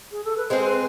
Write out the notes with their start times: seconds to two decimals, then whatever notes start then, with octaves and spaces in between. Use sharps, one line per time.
0.11 G#4
0.24 A4
0.37 B4
0.50 G#3 C4 G#4 C5
0.65 B4